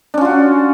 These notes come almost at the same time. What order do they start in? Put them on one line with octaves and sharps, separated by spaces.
D4 C#4 F4 F#4